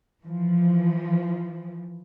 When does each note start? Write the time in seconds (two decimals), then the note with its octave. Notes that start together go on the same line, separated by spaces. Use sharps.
0.25 E3 F3